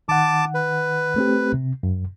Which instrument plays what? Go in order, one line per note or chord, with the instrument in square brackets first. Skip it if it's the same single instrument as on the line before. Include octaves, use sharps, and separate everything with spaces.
[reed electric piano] D#3 F#5 [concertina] A5 D6
[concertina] B4
[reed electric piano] A3 C4 G4
C3
F#2